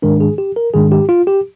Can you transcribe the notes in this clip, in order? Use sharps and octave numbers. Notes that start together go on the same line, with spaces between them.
G#2 D#3 G#3 D4 A#4
G#4
G4
A#4
G#2 D#3 G#3 D4 G#4
G4
F4
G4